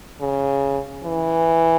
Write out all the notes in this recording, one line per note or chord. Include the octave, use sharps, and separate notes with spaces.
C#3
E3